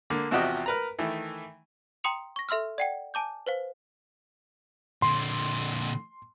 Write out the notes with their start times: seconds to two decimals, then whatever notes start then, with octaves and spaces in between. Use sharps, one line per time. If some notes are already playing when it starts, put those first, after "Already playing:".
0.10 D3 A#3
0.31 E2 C3 F3 F#4 G4 D#5
0.66 A#4 B4 A#5
0.99 D#3 E3 A3
2.04 G5 A#5 C6 D#6 C#7 F7
2.36 C#6 A#6
2.49 A4 E5 C6 E6 F6
2.78 D5 F#5 G5
3.14 G#5 A5 D6 G6
3.46 B4 C5 F5
5.02 A#2 D3 C6